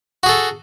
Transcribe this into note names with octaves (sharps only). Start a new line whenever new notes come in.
F#4 G#4 A4